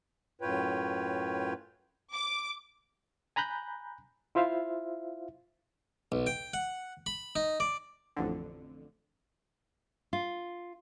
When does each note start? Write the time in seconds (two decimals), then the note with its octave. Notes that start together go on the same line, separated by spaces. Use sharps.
0.41 F#2 A2 F4 B4 C#5 G5
2.12 D6
3.36 G#5 A#5 B5 F#6 G6
4.35 E4 F4 C5 E5 F5
6.12 B1
6.27 G5
6.54 F#5
7.06 B5
7.36 D#4
7.60 D5
8.16 A1 F2 D3
10.13 F4